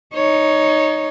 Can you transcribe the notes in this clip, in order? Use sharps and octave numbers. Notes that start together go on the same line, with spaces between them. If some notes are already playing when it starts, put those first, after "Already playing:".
D#4 C#5